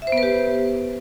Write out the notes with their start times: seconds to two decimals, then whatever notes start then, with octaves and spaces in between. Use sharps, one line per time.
0.02 E5
0.07 C5
0.12 B3
0.18 B4
0.23 G4